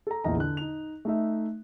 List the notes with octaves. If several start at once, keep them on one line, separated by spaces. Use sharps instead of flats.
A4 A#5
A#1 E2 D#5 A#5
D3 F#6
D#4 F7
A3 D#4 E5